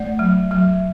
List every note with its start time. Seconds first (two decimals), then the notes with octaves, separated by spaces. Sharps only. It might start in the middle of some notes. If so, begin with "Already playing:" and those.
Already playing: A3 D5
0.19 F#3
0.51 F#3